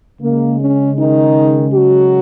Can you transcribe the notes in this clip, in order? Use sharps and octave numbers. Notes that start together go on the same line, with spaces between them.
C#3 G#3 A#3
C#4
D#3 D#4
F#3 F#4